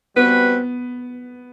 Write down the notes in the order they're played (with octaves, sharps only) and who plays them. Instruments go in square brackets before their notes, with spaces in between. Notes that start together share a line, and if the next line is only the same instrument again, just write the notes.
[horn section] G3 C4 F#4 B4 [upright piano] B3